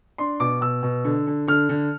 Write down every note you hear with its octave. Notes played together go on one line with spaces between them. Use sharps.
D4 C6
B2 D6
B2 E6
B2
D3
D3
D3 F6
D3